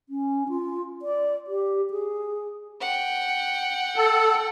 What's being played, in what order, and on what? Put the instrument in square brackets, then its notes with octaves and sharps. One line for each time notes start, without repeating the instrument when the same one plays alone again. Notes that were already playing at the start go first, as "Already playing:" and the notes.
[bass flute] C#4
F4
D5
G4
G#4
[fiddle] F#5 G5
[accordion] A4